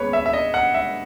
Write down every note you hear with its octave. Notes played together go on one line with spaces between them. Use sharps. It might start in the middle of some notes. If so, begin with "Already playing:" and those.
Already playing: D#2 C#3 G#3 B3 B4 C#5
E5
E5
D#5
F#5
E5